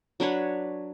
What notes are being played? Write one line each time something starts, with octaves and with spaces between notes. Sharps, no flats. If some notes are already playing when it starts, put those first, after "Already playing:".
F#3 D4 B4 C#5